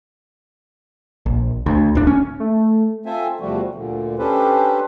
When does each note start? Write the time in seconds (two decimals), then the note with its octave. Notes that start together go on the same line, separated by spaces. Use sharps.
1.26 A#1
1.66 D2
1.95 D1 D4
2.07 C#4
2.40 A3
3.06 C4 F4 A4 C5 E5 G#5
3.40 E2 C3 F3 G3 A3 F#4
3.75 D2 A#2 D3
4.19 C#4 D4 G4 A4 B4 C5